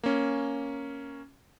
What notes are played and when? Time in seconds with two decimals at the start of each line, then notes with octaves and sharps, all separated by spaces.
0.04 A#3 C#4